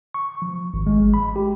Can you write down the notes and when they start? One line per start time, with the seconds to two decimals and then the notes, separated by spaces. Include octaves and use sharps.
0.14 C#6
0.42 F3
0.74 G#1
0.87 G#3
1.14 B5
1.36 G4